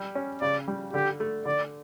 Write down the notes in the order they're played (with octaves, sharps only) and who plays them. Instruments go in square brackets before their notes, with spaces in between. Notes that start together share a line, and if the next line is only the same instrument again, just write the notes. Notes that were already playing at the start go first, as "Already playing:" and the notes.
Already playing: [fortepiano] G3
C#4
[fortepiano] C#3 [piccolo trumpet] D5
[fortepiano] G3
[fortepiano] D3 [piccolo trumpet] G4
[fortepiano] A3
[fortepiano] D3 [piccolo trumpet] D5